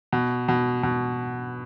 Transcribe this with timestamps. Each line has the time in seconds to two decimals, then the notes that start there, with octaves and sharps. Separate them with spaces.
0.13 B2
0.48 B2
0.83 B2